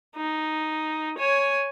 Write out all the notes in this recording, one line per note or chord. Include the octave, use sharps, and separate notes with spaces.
D#4
C#5 G#5